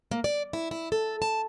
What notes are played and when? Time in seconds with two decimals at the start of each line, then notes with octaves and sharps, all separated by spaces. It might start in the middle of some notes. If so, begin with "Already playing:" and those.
0.11 A#3
0.24 D5
0.53 E4
0.71 E4
0.92 A4
1.22 A5